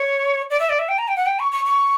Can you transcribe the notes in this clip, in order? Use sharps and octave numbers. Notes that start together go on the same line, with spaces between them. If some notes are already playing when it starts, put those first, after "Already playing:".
Already playing: C#5
D5
E5
D5
E5
G5
A#5
G5
F#5
G5
C#6
C#6
C#6